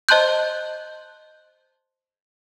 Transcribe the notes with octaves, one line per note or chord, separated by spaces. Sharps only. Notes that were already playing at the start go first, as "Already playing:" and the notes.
C5 D#5 A5 C6 F#6 G6